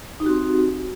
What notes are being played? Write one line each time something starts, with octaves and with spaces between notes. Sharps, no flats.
C4 D#4 F#4 G4